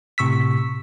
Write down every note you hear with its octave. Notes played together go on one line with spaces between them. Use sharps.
A2 C3 C#6 E6 B6